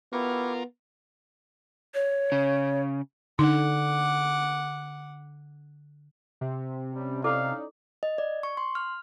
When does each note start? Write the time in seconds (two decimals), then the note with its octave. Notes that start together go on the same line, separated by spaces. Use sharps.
0.13 B3 E4 F4 G4 A#4 C#6
1.94 C#5
2.32 C#3
3.39 D3 D#4 F#5 D6
6.41 C3
6.94 G3 C#4
7.24 C#4 D#4 E4 A4 D5 F5 D6
8.03 D#5
8.18 D5
8.43 C#6
8.57 C6
8.75 F6